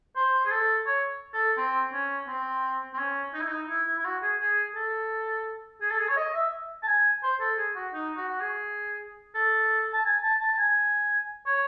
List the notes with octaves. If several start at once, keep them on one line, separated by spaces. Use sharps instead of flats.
C5
G#4
A4
C#5
A4
C4
C#4
C4
C4
C#4
D#4
E4
D#4
E4
E4
E4
F#4
G#4
G#4
A4
G#4
A4
G#4
C#5
D#5
E5
A5
G#5
C5
A4
G#4
F#4
D#4
F#4
F#4
G#4
A4
A5
G#5
A5
A5
G#5
C#5